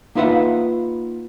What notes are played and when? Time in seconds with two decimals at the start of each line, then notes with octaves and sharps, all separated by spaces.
0.15 A#3 D#4 F4 B4 E5 F#5